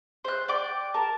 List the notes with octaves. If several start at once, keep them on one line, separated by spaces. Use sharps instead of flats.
C5 F#6
D5 G5 D6
A#4 A5